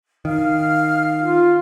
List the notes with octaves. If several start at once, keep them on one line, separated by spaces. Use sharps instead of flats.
D#3 F5 F6
F4